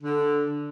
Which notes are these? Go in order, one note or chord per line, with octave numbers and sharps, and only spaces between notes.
D3